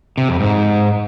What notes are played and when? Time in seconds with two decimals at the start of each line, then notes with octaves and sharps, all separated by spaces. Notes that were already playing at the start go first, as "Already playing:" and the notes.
0.18 C3
0.29 F2
0.40 G#2